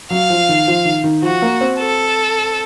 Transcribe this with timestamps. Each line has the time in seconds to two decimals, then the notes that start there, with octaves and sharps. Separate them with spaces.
0.10 F#3 F5
0.30 F3
0.49 D#3
0.67 F3
0.85 D#3
1.04 D#3
1.23 F3 F#4
1.42 A#3
1.61 C4
1.79 A4